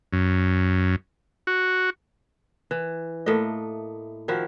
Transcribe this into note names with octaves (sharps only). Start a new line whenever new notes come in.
F#2
F#4
E3
A2 A3 A#3 D#5
D#3 F3 E4 F#4